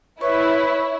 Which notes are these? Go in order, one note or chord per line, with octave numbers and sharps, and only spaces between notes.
E4 B4 C#5 C#6